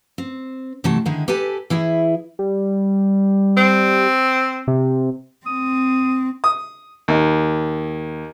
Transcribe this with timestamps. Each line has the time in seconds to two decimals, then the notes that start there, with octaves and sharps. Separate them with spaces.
0.18 C4
0.84 C3 E3 F#3 A3 A5
1.06 D3 D#3 G#3 E4
1.28 G4 A4 B4 G#5 A5
1.70 E3 E4 G#4 E5
2.39 G3
3.57 C4
4.67 C3
5.46 C4 D#6
6.44 D#6
7.08 D#2